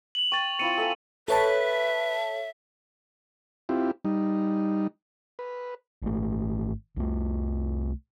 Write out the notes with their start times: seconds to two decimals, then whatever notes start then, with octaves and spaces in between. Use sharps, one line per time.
0.15 F7 F#7
0.32 G5 C#6 A6 F#7
0.59 C4 E4 F4 C#7 D#7
0.78 A4 E5 G#5
1.28 A4 B4 C#5 E5 A5
3.69 C4 E4 F4 G4
4.05 G3 D#4
5.39 B4
6.02 G#1 A3
6.96 C2 A3